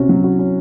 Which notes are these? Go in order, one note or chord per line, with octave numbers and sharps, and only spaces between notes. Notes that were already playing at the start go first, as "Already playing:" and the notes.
Already playing: C3 C#4 F#4
F#3
F#4
C#4